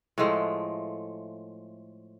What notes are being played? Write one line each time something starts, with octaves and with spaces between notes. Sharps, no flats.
A2 F3 G#3 A3